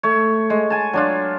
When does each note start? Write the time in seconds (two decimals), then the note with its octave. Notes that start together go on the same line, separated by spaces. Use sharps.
0.03 A3 C#5
0.50 G#3
0.70 G#5 A5
0.93 F#3 D4 F4